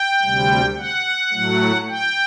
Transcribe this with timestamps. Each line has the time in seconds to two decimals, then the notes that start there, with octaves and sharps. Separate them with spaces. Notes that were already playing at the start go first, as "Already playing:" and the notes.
Already playing: G5
0.22 D2 C3 G3
0.78 F#5
1.32 A2 F#3 A3
1.89 G5